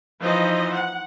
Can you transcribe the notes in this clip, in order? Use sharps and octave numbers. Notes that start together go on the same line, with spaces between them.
E3 F3 D#4 C5 D#5
F#5